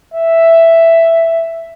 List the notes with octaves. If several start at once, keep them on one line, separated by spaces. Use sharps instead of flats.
E5